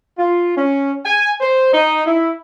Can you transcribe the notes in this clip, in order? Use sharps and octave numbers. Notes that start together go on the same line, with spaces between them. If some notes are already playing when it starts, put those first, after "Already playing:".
F4
C#4
G#5
C5
D#4
E4